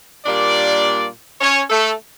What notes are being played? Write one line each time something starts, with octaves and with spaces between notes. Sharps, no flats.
A#2 G3 A#3 D4 D5
C#4 C#5
A3 A4